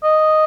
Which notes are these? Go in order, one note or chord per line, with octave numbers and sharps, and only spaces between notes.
D#5